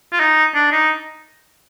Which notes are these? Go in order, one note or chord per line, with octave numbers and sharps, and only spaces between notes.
F4
D#4
D4
D#4